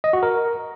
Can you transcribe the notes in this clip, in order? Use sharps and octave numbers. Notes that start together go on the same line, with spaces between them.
D#5
F#4
A#4